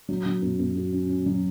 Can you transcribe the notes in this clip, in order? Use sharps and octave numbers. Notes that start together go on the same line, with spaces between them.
F#3
F#3
F#2
F#2
F#4
C#4
C#4
F#3